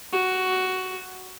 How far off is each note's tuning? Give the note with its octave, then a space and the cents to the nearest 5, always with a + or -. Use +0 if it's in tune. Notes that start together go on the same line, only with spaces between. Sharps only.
F#4 +10